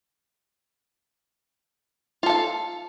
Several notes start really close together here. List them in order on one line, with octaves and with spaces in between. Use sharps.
F4 A4 F5